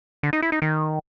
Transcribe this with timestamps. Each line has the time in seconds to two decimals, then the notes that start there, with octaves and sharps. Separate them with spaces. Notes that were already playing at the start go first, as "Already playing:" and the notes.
0.23 D3
0.33 D#4
0.42 E4
0.52 D#4
0.62 D#3